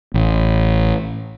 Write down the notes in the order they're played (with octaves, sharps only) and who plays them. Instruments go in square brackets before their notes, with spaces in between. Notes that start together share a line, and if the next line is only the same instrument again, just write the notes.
[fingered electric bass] A1